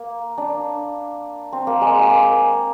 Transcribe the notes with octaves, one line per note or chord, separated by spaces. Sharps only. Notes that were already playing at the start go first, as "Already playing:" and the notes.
Already playing: A#3
D4
C4
A#3
G#3
G#3
A#3